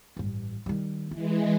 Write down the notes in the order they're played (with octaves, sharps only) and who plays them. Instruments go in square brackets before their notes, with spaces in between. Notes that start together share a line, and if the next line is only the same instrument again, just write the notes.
[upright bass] A1 G2
D#3 G3
[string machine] E3 G#3 [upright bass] E4